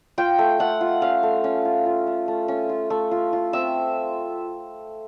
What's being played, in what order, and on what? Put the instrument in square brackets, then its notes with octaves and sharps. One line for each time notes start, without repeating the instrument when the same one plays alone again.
[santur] F4 G5
A3
A3 F#5
F4
C#4 F5
A3
C#4
F4
F4
A3
A3
C#4
F4
A3
F4
F4
C4 E5